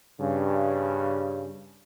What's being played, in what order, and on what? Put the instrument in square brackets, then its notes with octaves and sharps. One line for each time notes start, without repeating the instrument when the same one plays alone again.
[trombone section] G2 C#3